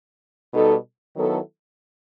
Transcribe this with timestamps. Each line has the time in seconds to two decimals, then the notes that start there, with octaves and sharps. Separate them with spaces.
0.53 B2 G3 D#4 A4
1.16 D#3 F#3 B3 E4 A4